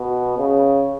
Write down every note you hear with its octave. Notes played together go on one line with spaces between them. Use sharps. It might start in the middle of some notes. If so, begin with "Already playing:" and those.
Already playing: B2
C#3